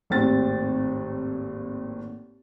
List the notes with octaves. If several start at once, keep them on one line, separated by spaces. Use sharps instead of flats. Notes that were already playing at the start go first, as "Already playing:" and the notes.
G#1 D#2 A2 C4 A6